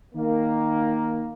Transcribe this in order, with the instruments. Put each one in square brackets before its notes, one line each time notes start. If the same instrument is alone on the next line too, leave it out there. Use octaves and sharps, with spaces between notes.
[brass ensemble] D#3 A#3